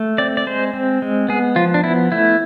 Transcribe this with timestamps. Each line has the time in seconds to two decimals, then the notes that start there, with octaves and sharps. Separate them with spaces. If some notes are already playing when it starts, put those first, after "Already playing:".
Already playing: A3
0.18 C4 D5
0.37 D5
0.47 G#3 C5
0.73 C4
1.02 G#3
1.28 B3 G#4
1.56 F3 F4
1.74 D4
1.84 B3 E4
2.12 A3 E4